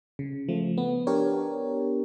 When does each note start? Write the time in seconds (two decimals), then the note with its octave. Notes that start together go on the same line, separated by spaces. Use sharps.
0.19 C#3
0.49 F3 A3
0.78 B3
1.07 D4 G4 A#4 C#5